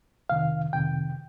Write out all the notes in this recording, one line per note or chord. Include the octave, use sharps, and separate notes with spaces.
F2 C3 D#3 F5
F2 C3 D#3 G5